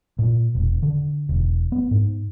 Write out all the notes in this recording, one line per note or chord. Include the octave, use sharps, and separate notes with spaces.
A#2
E1
D3
E1
B3
G#2